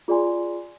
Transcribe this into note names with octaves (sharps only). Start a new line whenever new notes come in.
F4 G#4 D5 G#5 C6